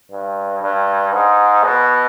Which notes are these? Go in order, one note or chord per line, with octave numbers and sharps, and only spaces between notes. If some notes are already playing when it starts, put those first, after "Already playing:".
G2
G2
G#2
B2